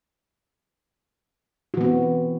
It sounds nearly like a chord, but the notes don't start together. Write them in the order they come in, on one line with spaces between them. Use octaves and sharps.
F#4 E3 B3 C4